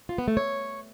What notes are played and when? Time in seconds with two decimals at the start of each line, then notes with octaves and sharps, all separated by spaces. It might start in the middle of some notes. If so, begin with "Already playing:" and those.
0.09 F4
0.18 B3
0.28 A3
0.37 C#5